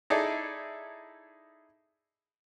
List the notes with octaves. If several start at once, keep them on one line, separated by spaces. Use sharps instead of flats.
D#4 E4 G#4 A4 D5